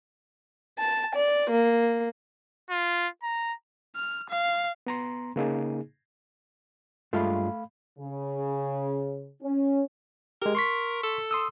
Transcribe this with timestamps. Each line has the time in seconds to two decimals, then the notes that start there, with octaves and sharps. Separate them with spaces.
0.79 A5
1.15 D5
1.49 A#3
2.70 F4
3.23 A#5
3.96 F6
4.30 F5
4.87 B3 A#5 C6
5.36 C#3 A#3 D#4 G#4
7.13 G2 G#3 A3 F4 F5 B5
7.99 C#3
9.42 C#4
10.42 G#3 G4 A#4
10.55 C6 C#6 B6
11.03 A4
11.31 C6 D#6 E6